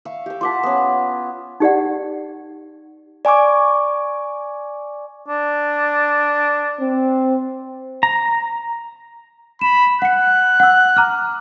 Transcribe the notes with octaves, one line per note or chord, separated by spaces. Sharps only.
E5 F5 C#6
G4 E5
F4 F#5 A5 C6 D6 B6
B3 C#4
D#4 G4 D5 F#5
D5 G#5 C#6 D6
D4
C4
A#5
B5 E7
F#5 F#6 C#7
F#5 E6
A#5 D6 F6